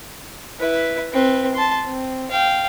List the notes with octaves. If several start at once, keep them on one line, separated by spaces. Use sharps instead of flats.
E4 B4
C4 B4
A5 C6
C4
F5 G5